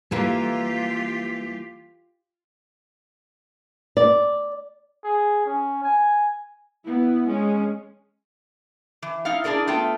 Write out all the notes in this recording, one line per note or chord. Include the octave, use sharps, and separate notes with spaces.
E3 G3 A#3 F4 G4
D5
G#4
C#4
G#5
B3 E4
G#3 C#4
E3
D#4 E4 F5
D4 E4 G#4 A#4 D5
A3 B3 F4 G5 A5